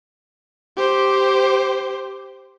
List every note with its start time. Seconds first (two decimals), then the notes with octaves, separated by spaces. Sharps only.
0.77 G4 C5